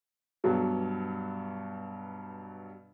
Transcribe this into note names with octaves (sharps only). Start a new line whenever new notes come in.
G2 B2 F#3